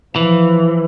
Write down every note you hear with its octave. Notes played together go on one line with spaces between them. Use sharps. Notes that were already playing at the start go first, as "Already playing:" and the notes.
E3 F3